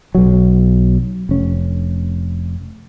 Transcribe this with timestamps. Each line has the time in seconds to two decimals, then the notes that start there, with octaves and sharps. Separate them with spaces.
0.15 B1 F#3
1.29 F1 C#4